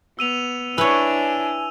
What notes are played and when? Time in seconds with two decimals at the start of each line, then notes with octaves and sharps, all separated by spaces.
0.19 B3 E6 D#7 F7
0.78 D4 E4 B4 C#5 G#5 E6